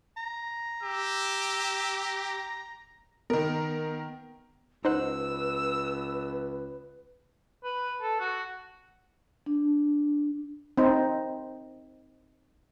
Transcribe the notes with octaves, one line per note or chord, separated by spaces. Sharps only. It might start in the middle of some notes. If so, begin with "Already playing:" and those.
A#5
G4 E6
D#3 B3 A#4
C#2 D#4 B4 C5 F#5 E6
B4
A4
F#4
D4
C4 D#4